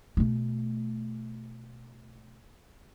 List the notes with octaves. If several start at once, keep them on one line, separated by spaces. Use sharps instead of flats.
B2 A3